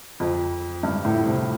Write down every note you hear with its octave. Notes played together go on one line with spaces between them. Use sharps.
F2
G2
A2
C3